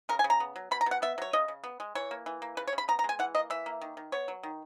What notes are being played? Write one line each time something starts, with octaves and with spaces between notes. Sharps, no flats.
C#3 A#4
G#5
C#3
A#5
B3
F#3
B2 B5
A#5
B2 F#5
B3 E5
F#3 C#5
C#3 D#5
C#3
B3
G#3
E3 C#5
A#3
E3
A#3
C#3 B4
C#5
C#3
B5
B3 A#5
A#5
G#3 G#5
E3 F#5
A#3 D#5
E3 E5
A#3
D#3
D#3
B3 C#5
F#3
D#3